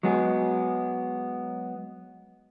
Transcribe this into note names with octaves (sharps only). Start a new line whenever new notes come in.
F#3 G#3 B3 G#4